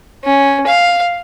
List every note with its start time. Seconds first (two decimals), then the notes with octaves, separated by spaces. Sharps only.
0.24 C#4
0.66 F5